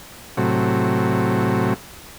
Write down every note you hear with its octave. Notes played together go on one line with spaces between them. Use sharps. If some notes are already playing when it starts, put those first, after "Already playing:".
A2 C3 F#3